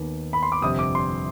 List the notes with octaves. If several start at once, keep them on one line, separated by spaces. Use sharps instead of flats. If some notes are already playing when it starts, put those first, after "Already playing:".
Already playing: D#2 D#3 B3
B5
C6
D6
G1 F2 C3 D#6
D6
C6